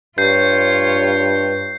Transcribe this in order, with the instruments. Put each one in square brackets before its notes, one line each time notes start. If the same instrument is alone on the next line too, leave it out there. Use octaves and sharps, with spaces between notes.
[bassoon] G2 [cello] F4 C#5 [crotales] G6 C7